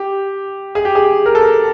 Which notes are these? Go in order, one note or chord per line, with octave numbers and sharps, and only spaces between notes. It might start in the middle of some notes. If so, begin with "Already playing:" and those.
Already playing: G4
G#4
G4
G#4
A#4
A4
A#4